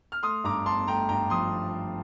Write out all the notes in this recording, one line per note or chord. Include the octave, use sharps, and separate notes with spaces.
F6
A3 C6 D#6
G2 A#5 D6
G1 A5 C6
A3 G5 A#5
G2 G5 A#5
F3 C6 D#6